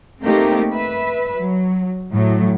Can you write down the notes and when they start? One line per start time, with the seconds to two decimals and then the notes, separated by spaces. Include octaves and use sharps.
0.22 A3 A#3 C4 D#4 G4 A#4
0.71 B4 E5
1.38 F#3
2.12 A2 F#3